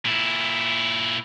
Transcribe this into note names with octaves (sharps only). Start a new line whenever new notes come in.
A#2 E4